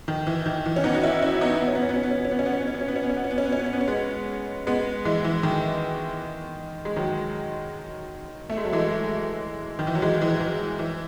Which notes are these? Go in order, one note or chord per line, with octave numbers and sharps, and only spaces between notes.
D#3
E3
D#3
E3
C#4
B3 D#4
F#4
C#4 E4
C#4 E4
B3 D#4
B3
C#4
B3
C#4
B3
C#4
B3
C#4
B3
C#4
B3
C#4
B3
C#4
B3
C#4
B3
C#4
B3
C#4
B3
C#4
B3
C#4
B3
C#4
B3
C#4
B3
C#4
B3
C#4
G#3 B3
G#3 B3
E3 G#3
E3
D#3
G#3
D#3 F#3
A3
G#3
F#3
E3 G#3
D#3
E3
F#3
E3 G#3
E3 G#3
E3
E3